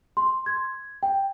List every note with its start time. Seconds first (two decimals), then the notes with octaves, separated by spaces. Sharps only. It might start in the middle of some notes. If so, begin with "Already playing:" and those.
0.17 C6
0.46 G#6
1.03 G5